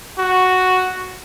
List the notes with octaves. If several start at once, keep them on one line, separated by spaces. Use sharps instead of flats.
F#4